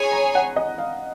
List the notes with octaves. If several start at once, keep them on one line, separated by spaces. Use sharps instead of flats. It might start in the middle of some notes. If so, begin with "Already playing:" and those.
Already playing: G#4 C#5 G#5 B5
A#5
F#5
D#5
F5